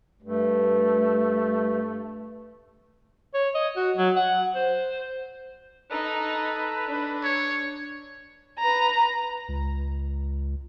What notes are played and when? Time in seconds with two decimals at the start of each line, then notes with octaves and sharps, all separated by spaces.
0.22 G2 A3
3.34 C#5
3.55 D#5
3.76 F#4
3.96 F#3
4.16 F#5
4.55 C5
5.91 D#4 A4 B4 A5 A#5
6.87 D4
7.24 C#5
8.59 B4 A#5
9.48 C#2